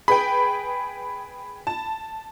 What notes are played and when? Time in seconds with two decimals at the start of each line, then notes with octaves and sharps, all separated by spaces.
0.08 G#4 B4 G5 B5
1.67 A5